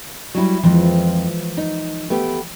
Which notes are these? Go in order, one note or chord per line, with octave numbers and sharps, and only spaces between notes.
F#3 G3 E4
F2 E3 F3 G#3
D#4
A3 B3 G4